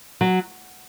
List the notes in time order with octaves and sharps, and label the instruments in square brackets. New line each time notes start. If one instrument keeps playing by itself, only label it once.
[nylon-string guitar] F#3